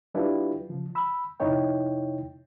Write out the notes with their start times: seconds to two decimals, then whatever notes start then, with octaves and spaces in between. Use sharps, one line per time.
0.14 F#3 D4 E4 F4 G4 B4
0.69 C#3 F3
0.95 B5 E6
1.40 F2 C3 D#4 E4 C#5 G5